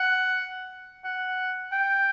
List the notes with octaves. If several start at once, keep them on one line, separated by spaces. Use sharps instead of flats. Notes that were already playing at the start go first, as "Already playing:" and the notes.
Already playing: F#5
F#5
G5